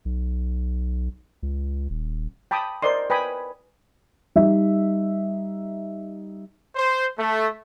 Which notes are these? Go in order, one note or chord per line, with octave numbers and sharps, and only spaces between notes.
B1
C#2
D#1
G5 A5 B5 D6 D#6
A#4 C5 D5 D#5 C6
B4 G5 G#5 B5 D#6
G3 D#4 E5
C5
A3